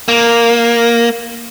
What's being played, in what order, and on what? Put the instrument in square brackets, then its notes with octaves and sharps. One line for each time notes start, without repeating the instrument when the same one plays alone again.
[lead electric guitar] A#3